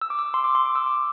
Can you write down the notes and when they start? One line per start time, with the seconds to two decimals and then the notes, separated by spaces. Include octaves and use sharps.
0.01 E6
0.10 D6
0.19 E6
0.34 C6
0.44 D6
0.55 C6
0.65 D6
0.75 E6
0.86 D6